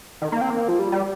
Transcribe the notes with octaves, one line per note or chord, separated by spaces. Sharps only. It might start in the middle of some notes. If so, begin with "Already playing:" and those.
D#3
A#3
C4
A#3
F3
G3
G3